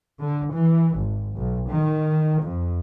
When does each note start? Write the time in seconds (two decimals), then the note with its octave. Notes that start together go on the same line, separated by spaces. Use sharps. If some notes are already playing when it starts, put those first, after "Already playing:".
0.20 D3
0.52 E3
0.98 G#1
1.35 B1
1.70 D#3
2.42 F2